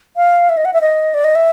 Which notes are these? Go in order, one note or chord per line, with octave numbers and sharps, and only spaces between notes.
F5
E5
D#5
F#5
E5
D#5
D5
D#5
E5